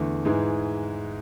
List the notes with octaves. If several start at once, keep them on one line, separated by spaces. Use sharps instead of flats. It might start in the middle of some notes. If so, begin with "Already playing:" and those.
Already playing: E2 D3 A3
G#2 E3 G#3